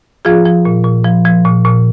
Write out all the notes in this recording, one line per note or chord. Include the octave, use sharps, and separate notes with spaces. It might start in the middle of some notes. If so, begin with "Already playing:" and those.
F3 F4 G#4
F3
A#2
A#2
F3
F3
A#2
A#2